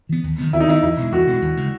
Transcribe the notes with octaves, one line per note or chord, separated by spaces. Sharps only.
E3 B3
D#2
D#3 F#3 B3
D#2 E4
D#4
D#3 F#3 B3 E4
E2 E4
B2 G#3
E2 F#4
B2 G#3
D#2
C#3 G#3